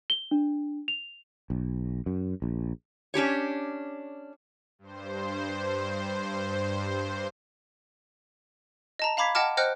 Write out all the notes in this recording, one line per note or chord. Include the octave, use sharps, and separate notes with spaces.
G7
D4
F7
B1
F#2
A#1
C#4 D4 G4 C#5
G2 C5
D#5 A5 A#5
F5 A#5 B5 D6 G#6 B6
D#5 F#5 G5 A5 D6 F6
C5 D#5 G5 F6 F#6 C#7